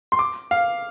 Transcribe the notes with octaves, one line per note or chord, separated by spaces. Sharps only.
C6
D6
F5